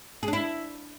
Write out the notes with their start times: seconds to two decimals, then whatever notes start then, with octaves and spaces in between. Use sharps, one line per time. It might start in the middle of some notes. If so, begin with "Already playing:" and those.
0.23 G#4
0.28 D4
0.33 E4